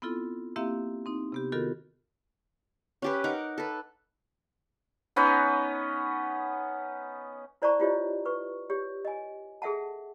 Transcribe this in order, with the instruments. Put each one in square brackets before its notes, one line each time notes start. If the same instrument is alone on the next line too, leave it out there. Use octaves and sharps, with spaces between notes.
[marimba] B3 C4 E4 F4 A4
A#3 C4 E4 G4 E5 F5
C4 D#4
C3 B3 G4
D#3 B3 F4 F#4 A4 A#4
[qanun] C#4 G4 B4
D#4 A#4 F#5 D6
A4 B4
[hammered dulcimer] B3 C#4 D#4 B4
[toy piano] E4 C5 D5 A5 A#5 C#6
E4 F4 G4 C5 C#5 D#5
B4 C#6
G4 C#5
D#5 G#5
G#4 A4 E5 F#5 A5